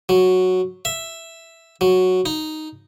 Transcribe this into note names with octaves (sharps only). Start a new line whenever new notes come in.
F#3
E5
F#3
D#4